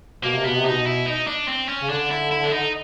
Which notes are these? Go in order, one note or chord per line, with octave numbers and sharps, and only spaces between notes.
B2 A#3
C3
B2 B3
C3
D#4
B2
E4
D#4
D4
C4
C#4
C#3
D3 D4
E4
E4
D4
D#4